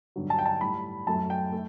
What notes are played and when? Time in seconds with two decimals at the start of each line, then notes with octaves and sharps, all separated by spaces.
0.16 G2 D3 F#3
0.30 A5
0.39 G5
0.46 A5
0.61 A2 G3 B5
1.07 F#2 F#3 A3 A5
1.30 G5
1.52 A3